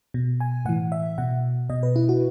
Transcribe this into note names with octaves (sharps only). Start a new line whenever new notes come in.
B2
G#5
A2 E3 F#5
E5
B2 F#5
B2 D#5
B4
E4
F#4